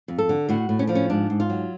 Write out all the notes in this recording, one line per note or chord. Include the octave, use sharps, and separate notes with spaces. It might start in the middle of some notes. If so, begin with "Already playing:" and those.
F2
A4
D3
A2 F#4
A2
C#4
F3 D4
C#4
G#2 D4
G#2
F4
F#3